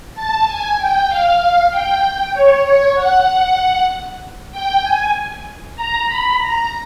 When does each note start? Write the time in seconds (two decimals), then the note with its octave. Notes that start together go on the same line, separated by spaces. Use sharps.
0.14 A5
0.46 G#5
0.77 G5
1.08 F5
1.70 G5
2.33 C#5
2.64 C#5
2.95 F#5
4.52 G5
4.82 G#5
5.76 A#5
6.07 B5
6.38 A#5